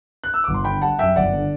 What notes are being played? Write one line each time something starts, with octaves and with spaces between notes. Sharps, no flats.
F#6
E6
G1 D6
C6
D3 G5 B5
G3 F#5 A5
F#2 E5 G5
G1 D5 F#5
D3